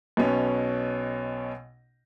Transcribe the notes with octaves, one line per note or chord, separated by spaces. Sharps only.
B1 B2 B3 C#4